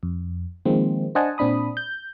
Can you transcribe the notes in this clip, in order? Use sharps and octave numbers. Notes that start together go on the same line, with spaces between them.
F2
D#3 F3 G#3 A#3 C4
D4 C5 D#5 F#5 G#5 A5
A#2 C4 D4 B5 D#6
G6